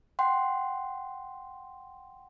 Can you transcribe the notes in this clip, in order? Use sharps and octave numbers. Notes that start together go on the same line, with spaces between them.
F#5 G5 C6